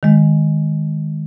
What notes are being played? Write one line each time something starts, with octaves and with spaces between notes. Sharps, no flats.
D#3 G#3